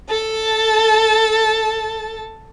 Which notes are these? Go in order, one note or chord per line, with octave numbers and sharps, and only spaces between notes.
A4 A5